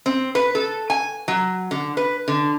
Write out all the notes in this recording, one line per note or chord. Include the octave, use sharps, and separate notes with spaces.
C4
B4
A4
G#5
F#3
D3
B4
D3